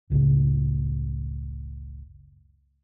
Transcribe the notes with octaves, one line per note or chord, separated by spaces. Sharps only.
F#1 C#2 A2 C#3